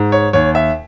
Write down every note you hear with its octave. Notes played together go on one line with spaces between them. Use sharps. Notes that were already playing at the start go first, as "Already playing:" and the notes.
Already playing: G#2
C#5
D#2 C#5
E5